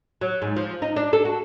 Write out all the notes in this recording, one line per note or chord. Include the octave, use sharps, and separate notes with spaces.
F#3
G#2
F3
D#4
D4
A4
F#4